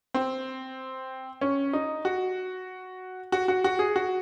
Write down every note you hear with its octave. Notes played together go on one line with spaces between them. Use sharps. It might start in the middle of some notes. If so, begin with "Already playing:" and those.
C4
C#4
D#4
F#4
F#4
F#4
F#4
G#4
F#4